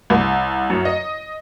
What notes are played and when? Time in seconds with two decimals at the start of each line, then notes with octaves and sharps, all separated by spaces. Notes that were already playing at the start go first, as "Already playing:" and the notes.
0.10 C2
0.70 F#2
0.85 D#5